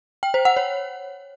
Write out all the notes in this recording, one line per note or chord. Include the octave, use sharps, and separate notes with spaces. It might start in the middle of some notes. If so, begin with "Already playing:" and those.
G5
C5
F#5
C#5